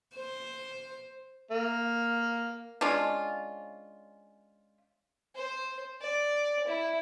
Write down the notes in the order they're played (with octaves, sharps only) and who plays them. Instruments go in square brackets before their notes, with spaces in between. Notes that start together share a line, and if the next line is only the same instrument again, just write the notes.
[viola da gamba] C5
[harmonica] A#3
[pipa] G#3 C#4 D4 F4
[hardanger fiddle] C5
D5
E4